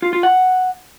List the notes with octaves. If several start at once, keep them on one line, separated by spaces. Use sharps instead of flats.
F4
F4
F#5